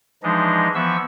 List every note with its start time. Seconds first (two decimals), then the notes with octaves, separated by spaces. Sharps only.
0.23 E3 F3 G#3 D4 D#4 D#5
0.75 E3 F3 B3 E5 C#6 E6